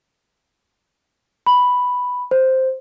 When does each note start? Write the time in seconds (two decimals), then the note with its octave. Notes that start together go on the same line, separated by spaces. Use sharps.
1.47 B5
2.31 C5